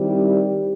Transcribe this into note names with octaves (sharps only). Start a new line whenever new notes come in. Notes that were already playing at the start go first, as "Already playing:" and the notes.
Already playing: D#3 G3 C4 E4 G4